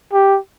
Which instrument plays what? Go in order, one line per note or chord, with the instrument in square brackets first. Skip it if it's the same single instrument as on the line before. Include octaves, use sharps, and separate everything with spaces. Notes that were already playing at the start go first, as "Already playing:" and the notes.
[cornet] G4